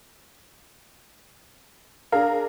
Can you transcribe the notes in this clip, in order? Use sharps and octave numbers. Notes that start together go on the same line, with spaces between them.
D4 G#4 A#4 F5